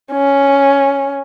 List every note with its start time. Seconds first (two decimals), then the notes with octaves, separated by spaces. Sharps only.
0.12 C#4